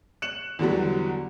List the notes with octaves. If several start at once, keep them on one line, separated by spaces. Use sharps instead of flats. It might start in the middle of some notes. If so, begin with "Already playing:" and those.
F#6 C#7 E7 F#7
E2 D3 F#3 G3